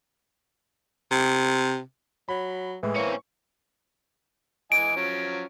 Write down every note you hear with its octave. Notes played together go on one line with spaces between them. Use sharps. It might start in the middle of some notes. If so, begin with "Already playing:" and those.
C3
F#3 B5
A2 E3 G#3
A#3 C4 C#4 C#6 C#7
E3 D#5 G#5 D7
F3 F#3 C#4